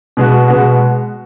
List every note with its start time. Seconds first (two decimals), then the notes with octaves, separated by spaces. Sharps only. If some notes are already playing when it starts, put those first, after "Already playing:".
0.17 B2 G#3 B3 F#4
0.48 B2 G#3 B3 F#4